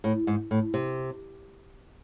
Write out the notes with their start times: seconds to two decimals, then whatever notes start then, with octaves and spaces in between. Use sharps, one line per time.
0.04 A2
0.27 G#2
0.51 A2
0.74 C3